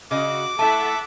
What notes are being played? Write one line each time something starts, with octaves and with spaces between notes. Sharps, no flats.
C#3 F#4 D#5 D6
A3 E4 A4 E5 F#5 A5